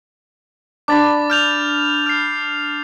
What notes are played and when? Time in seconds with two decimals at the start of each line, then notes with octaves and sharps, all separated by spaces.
0.88 D4 B5 D6 A6
1.30 F6 G6 F7
2.06 F6 C7